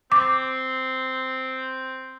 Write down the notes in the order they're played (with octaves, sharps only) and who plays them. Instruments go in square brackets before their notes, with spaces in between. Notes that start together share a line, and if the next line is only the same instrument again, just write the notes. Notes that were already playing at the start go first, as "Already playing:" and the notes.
[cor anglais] C4 [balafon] D6